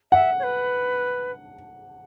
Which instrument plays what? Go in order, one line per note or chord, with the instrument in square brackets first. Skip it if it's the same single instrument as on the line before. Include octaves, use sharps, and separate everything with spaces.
[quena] E5 [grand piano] F#5
[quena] C#5
B4